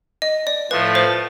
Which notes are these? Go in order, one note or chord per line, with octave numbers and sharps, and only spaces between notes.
D#5
D5
A2 F3 A3 B4
C5